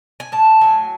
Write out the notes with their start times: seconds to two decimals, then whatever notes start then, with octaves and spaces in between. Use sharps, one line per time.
0.20 G#5
0.32 A2 A5
0.61 F#3 G#5